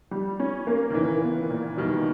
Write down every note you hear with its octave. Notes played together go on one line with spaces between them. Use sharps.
G3
C#4
A#3
D#3
A#2 C#3 E3
B3
A#2
B2 D#3 G3